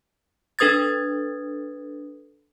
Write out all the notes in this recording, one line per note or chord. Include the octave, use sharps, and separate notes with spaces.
D4 A4 B4 D#6 G#6 A6